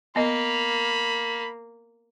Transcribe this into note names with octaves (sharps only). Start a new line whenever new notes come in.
A#3 B3 D#5 B5